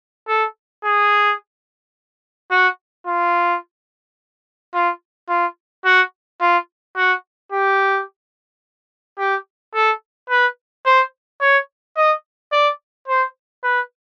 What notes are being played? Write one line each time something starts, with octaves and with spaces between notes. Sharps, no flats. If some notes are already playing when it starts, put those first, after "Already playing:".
A4
G#4
F#4
F4
F4
F4
F#4
F4
F#4
G4
G4
A4
B4
C5
C#5
D#5
D5
C5
B4